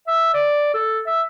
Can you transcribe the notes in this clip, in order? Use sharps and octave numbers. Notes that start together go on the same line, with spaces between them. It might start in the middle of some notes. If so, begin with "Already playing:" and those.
E5
D5
A4
E5